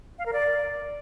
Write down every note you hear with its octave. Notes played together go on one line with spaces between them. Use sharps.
F5
A#4
D5